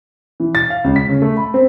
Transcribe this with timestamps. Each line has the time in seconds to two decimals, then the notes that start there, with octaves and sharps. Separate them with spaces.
0.40 E3
0.55 A6
0.70 F5
0.84 C#2
0.96 B6
1.09 C#3
1.22 A3
1.37 B5
1.54 C4